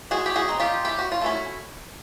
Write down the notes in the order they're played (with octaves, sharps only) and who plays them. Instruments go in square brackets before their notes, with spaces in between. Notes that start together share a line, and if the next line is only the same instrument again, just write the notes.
[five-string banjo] G#3 F#4 G#4
G4
F#4 G#4
C4 D#4
F4 G4
E3 G4
F#4
F4
A3 C#4 E4 F#4